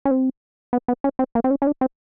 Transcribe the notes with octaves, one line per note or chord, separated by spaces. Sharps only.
C#4
C4
B3
B3
C#4
C4
A#3
C4
C#4
C#4
D4
C4